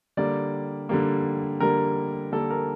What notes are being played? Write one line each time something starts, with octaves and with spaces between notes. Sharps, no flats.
D3 G3 A#3 D5
D3 G3 A#3
D3 G3 A#3 A#4
D3 G3 A#3 A4
A#4